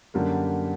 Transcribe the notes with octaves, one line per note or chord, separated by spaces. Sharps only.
F#2 D3 G3 A#3